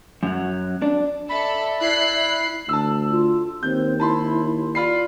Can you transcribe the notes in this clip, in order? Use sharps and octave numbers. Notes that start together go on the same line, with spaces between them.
F#2 F#3
D4
A4 D5 E5 B5
E4 B5 F#6 C7
D2 A5 E6
F4
D#2 C4 G6
E4 A5 B5 C6
F4 D5 B5 C7